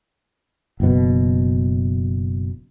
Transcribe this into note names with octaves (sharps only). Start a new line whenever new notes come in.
F#1 B2